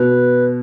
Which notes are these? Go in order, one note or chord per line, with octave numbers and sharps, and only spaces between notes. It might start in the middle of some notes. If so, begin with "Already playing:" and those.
Already playing: B2 B4